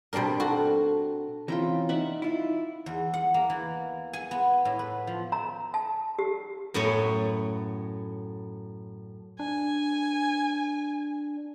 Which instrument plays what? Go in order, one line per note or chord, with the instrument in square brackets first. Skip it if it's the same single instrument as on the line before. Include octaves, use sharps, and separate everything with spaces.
[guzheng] B2 G3 C4 D4 A#4
F#4 A4
[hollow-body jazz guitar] C3 E3 [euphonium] C#4 [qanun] F4 G5 A#5
[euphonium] D#4 [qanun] D5 E5 F#5
[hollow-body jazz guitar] E4 F4
[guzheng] E2
F#5
A#3
E3
G#5
B3
A2
B4
F3
[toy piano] A#5
A5
G4
[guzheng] F#2 A2 A3 B3 C#5 G#5
[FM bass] D4 [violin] G#5